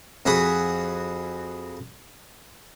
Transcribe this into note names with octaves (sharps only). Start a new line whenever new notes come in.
F2 F#4 G#4 B5 D#6